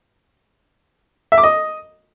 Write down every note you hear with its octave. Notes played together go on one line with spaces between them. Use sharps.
E5
D6
D#5